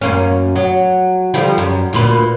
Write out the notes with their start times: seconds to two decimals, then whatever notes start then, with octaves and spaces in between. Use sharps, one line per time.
0.02 F#2 A#3 C#4
0.56 F#3
1.34 D3 F3 G3
1.58 F#2
1.93 D2 A#2 B4